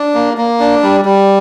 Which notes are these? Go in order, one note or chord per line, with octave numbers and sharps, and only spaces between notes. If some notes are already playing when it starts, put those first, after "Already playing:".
Already playing: D4
A#3
A#3
D4
G3
G3